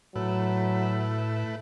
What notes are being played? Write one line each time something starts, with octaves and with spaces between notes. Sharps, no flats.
A2 F#3 A3 E4 B4